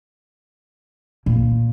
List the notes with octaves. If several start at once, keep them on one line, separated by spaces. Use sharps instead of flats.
A#2